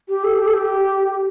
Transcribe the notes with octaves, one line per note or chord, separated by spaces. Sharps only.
G4
A4
G4
A4
G4